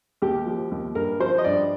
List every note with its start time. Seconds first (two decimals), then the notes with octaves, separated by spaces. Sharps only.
0.22 D#2 G4
0.46 F3
0.71 D#2
0.95 G2 A#4
1.20 F3 C5
1.38 D#5
1.44 G2 D5